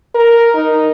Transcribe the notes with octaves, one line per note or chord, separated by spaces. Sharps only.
A#4
D#4